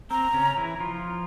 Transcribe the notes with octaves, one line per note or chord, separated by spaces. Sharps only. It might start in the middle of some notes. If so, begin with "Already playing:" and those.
C4 A#5
C#3 C#4
E3 E4
F3 F4